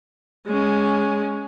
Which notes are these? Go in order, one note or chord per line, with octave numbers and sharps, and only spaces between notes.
G#3 C#4